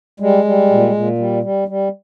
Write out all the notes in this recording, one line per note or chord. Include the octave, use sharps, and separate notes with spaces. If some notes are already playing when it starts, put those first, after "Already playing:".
G3 G#3
G3
A#2
A#2
G3
G3
G3